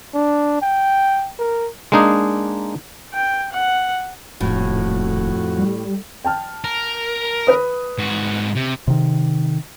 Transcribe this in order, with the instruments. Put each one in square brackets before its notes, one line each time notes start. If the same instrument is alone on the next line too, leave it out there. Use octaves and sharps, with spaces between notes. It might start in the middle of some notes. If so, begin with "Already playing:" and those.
[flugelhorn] D4
G5
A#4
[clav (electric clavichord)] G#3 A#3 D4 D#4 G#4
[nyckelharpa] G5
F#5
[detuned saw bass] D#1 [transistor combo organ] F2 F#4 [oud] A2
[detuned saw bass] G3
[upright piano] G5 A5 F6
[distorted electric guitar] A#4
[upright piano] B4 D#6
[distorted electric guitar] G#2 F#4
C3
[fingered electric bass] C3 D#3